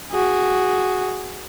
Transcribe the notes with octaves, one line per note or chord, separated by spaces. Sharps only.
F#4 G#4